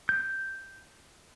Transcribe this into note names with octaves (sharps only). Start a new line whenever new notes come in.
G6